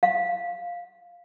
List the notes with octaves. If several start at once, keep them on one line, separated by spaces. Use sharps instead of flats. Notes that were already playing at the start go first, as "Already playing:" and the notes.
F5